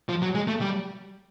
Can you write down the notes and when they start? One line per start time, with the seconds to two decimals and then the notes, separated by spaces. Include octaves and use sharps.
0.09 F3
0.22 F#3
0.35 G#3
0.47 A3
0.61 G3